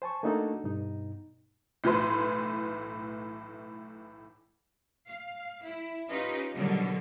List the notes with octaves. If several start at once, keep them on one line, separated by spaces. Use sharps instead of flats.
C5 G#5 A5 C#6
A3 A#3 D4 D#4 F#4 A4
G2 B2 D#4
B1 A2 E3 B4 C6
F5
E4
C#4 D#4 F4 G4 B4 D#5
B2 D3 D#3 F#3 G3